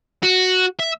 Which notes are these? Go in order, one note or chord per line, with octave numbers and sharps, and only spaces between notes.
F#4
E5